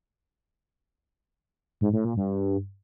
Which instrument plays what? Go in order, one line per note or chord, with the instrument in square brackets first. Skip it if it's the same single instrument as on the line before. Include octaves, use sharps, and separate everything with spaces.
[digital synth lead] G#2
A2
A#2
G2